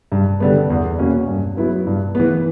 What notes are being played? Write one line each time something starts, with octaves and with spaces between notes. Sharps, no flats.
G2
D3 G3 B3
E2
B2 A#3 C#4 F#4
G2
F#3 B3 E4 B4
G2
E3 B3